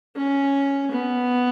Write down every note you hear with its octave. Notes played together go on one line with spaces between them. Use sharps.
C#4
B3